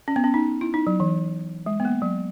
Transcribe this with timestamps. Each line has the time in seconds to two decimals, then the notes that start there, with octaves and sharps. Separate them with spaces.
0.08 C#4
0.16 B3
0.24 C#4
0.34 D#4
0.61 E4
0.74 D#4
0.87 F#3
1.00 E3
1.66 G#3
1.80 B3
1.85 A#3
2.02 F#3